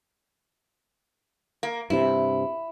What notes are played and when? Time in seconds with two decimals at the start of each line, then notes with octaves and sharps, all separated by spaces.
1.63 A#3
1.90 G2 C3 E4